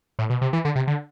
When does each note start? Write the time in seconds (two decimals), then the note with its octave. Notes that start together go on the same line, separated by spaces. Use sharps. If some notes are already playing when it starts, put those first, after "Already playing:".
0.19 A2
0.30 B2
0.41 C3
0.53 E3
0.65 D3
0.76 C3
0.88 D3